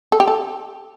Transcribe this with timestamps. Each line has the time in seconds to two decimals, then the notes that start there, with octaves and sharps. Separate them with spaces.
0.12 A4
0.20 G4
0.28 A4